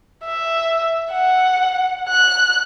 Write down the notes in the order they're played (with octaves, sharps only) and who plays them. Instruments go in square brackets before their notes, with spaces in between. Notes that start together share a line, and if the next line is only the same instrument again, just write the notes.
[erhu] E5
F#5
F#6